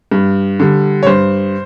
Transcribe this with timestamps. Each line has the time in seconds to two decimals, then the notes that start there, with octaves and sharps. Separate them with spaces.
0.12 G2
0.60 D3 G3
1.03 C#5
1.07 G2 C5